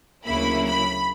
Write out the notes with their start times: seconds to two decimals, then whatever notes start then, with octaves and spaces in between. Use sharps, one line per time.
0.25 D2 C#3 F#3 A#3 E4 B5
0.66 B5